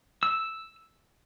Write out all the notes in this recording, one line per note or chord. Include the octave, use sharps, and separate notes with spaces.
E6